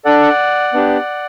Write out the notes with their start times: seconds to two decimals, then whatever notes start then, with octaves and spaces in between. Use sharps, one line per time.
0.05 D4 A4 D5 F#5
0.74 B3 D4 G4